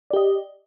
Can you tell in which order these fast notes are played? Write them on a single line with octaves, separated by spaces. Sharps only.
D5 G4 D#5